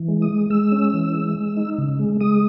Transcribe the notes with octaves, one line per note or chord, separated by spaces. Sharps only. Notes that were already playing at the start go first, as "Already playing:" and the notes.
Already playing: E3
G#3
D#6
G#3
G#3 E6
C#4
E3
G#3
G#3
D#4
C#3
G#3
G#3 D#6